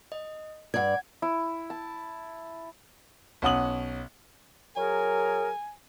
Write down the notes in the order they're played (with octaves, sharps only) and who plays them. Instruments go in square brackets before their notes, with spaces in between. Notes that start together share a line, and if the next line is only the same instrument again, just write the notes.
[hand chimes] D#5
[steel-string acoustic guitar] G2 D5 [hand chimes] F#5 G#6
[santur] E4
A5
[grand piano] B1 C#4 F#5 D#6 F#7
[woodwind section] F#3 G#4 A#4 [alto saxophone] G#5